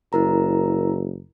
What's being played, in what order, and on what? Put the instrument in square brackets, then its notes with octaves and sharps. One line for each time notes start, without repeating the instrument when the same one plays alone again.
[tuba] F#1 [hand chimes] E4 A#4 A#5